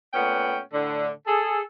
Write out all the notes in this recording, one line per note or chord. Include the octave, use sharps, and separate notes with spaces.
A#2 A3 B3 C#4 F#5 G5
A2 D3
G#4 A4